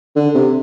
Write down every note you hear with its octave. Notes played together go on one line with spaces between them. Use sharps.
D3
C3